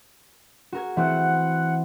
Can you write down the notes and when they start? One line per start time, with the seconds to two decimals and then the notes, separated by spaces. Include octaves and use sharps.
0.73 F#4 A#4 G#6
0.97 E3 A3 C4 F#5